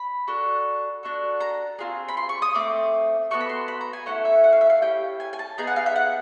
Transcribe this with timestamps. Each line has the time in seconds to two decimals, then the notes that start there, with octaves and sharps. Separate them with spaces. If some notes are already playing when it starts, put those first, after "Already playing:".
Already playing: B5
0.28 D4 F#4 A4
1.03 D4 F#4 A4
1.40 A#5
1.79 C4 F4 G#4
2.09 B5
2.17 C6
2.29 C#6
2.42 D#6
2.54 A3 C4 D6
3.31 B3 D#4 F#4 A4 C#6
3.40 B5
3.49 C6
3.68 B5
3.81 A#5
3.93 G#5
4.06 A3 C#4 E4 A4 F#5
4.25 E5
4.44 F#5
4.53 F5
4.61 E5
4.70 F5
4.81 C#4 E4 G4 G5
5.20 G#5
5.33 G#5
5.39 A5
5.58 B3 D#4 G#4 A#5
5.67 F#5
5.76 F5
5.86 E5
5.96 F#5